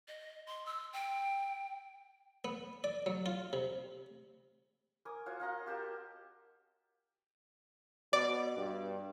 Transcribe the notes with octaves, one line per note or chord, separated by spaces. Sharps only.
D#5
C6
E6
G5
B3
D5
F#3
F4
C3
A#4 G#5 D6 D#6
F4 F#4 C#5
F4 D#5 A#5
F#4 G4 A#4 A5
B2 D5
G2